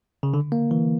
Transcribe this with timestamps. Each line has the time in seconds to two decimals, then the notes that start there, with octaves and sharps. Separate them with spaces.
0.23 C#3
0.34 D3
0.52 A#3
0.71 E3